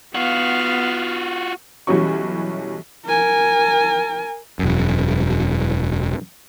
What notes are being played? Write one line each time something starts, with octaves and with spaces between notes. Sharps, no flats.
B3 F4 F#4 F5
B1 E3 G3 C#4 F#4 C#6
A#4 G#5
E1 F#2